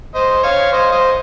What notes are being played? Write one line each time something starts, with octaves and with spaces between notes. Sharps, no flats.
C5 D#5
C#5 F5
C5 D#5
C5 D#5